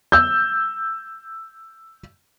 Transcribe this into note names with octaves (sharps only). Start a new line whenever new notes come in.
E6 G6